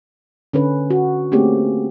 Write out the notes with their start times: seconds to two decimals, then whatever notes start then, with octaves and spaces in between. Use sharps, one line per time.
0.53 D3 C#4 B4
0.90 F#4
1.32 A3 A#3 C4 C#4 G4 G#4